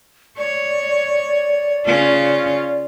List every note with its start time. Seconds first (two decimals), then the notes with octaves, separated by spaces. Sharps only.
0.38 C#5 D5
1.85 C#3 C#4 F4